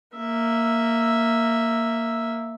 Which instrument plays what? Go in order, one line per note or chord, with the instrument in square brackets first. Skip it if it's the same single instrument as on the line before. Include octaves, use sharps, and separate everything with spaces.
[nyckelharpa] A#3 E5